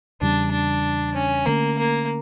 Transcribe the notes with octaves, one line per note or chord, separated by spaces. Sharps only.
E2 C#3 G3 D4
D4
C#4
D3 A3 A#3 C#4
A#3